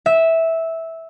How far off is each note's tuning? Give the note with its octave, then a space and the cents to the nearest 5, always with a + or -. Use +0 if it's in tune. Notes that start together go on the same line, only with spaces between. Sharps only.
E5 -10